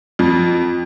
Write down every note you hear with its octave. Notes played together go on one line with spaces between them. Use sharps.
F2